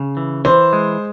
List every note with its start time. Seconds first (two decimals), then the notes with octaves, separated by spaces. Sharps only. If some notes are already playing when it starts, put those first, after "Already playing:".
Already playing: C#3
0.17 E3
0.45 E3 C5
0.73 G#3